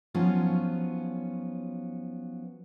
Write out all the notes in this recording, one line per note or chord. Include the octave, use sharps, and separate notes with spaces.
F3 F#3 B3 C#4 D#4 F4